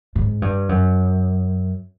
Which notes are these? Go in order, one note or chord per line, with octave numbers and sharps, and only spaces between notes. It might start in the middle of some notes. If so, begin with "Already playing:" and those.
G#2
G2
F#2